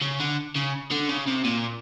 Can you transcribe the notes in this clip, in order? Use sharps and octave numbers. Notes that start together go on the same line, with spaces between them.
C#3
D3
C#3
D3
C#3
C3
A#2